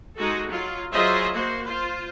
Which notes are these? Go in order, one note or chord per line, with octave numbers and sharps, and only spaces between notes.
G#3 D#4 F#4 G#4 A4
F#3 F4
F#3 F4 G#4 C5 D#5 E5
A#3 F#4 C5
F4 C5